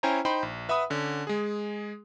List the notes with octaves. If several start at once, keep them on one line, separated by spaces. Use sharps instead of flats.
C#4 E4 C5 G5 G#5 A#5
D#4 C5 G5 B5 C6
A#1
B4 E5 F#5 B5 D#6
D3 C#4
G#3 G#4